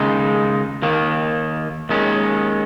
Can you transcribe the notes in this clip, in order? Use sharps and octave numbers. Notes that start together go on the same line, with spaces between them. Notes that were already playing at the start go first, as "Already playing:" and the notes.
Already playing: D#2 C#3 G#3 D#4
D#2 D#3 A#3
D#2 D#3 G#3 C#4